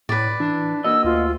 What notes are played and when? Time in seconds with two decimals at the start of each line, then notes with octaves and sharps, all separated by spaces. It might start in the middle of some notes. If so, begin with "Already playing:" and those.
0.09 A2 B4 D5
0.40 E3 D4
0.84 A#3 F#4 D#5 E6
1.05 D2 F4